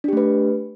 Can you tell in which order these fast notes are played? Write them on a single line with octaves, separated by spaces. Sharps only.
D4 G4 A3 B4